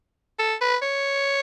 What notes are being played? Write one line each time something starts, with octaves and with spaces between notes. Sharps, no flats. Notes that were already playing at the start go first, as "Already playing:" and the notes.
A4
B4
C#5